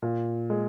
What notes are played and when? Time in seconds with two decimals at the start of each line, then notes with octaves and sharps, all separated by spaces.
0.02 A#2
0.50 G#3